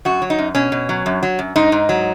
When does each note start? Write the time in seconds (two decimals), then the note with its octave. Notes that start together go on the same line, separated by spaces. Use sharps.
0.05 F#2 F#4
0.22 F#3
0.30 D#4
0.38 F#2
0.55 B2 C#4
0.72 B2
0.89 F#3
1.06 F#2
1.23 F#3
1.39 F#2
1.56 G#2 D#4
1.72 G#2
1.89 F#3